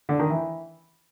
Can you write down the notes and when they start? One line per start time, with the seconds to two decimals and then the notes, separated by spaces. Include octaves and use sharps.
0.09 D3
0.19 D#3
0.30 E3